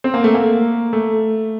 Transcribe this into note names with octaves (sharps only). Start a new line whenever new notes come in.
C4
A#3
A3
A#3
A3